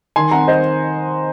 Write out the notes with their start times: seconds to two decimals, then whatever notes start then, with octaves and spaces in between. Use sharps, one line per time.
0.16 D#3 G#5 C6
0.31 F2 F#5 A#5
0.48 C5 D#5